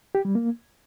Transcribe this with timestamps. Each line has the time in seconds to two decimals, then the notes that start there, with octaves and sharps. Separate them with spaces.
0.15 G4
0.25 G3
0.35 A#3